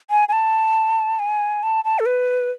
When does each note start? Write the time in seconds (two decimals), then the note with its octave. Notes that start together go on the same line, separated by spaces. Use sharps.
0.10 G#5
0.29 G#5
0.33 A5
1.19 G#5
1.63 A5
1.84 A5
1.99 A4
2.06 B4